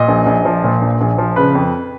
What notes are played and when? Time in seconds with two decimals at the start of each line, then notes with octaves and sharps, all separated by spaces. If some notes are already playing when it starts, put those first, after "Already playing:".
Already playing: A#2 D#5
0.08 A#1
0.26 A#1
0.45 F3
0.64 A#2
0.82 A#1
1.01 A#1
1.18 F3
1.36 C#3 B4
1.55 F2